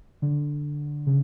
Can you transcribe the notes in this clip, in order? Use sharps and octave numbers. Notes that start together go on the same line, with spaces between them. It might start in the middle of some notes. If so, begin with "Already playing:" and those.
D3
C#3